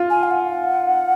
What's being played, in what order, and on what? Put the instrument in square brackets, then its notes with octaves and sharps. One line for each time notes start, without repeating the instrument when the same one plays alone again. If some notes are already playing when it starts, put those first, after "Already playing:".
Already playing: [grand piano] F4
[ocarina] G#5
F5
F#5